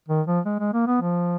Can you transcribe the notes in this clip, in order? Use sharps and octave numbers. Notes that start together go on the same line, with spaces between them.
D#3
F3
G#3
G#3
A#3
B3
F3